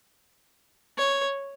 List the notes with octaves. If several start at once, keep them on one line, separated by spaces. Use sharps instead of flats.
C#5